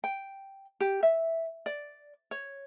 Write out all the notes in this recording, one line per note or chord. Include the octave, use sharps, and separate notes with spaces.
G5
G4
E5
D5
C#5